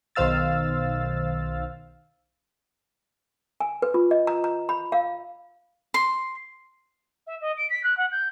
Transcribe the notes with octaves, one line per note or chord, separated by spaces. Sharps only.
B1 D#3 C5 F5 E6 A6
G#5
B4
F4
D#5
A#5
A#5
B5
F5
C6
E5
D#5
D7
B6
F#6
F#5
G6